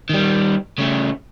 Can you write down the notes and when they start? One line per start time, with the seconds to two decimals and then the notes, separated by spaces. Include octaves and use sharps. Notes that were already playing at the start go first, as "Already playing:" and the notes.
0.09 D#3 G3
0.79 C#3 A3